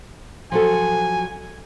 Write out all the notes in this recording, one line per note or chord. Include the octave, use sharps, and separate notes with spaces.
F3 F#3 A4 G#5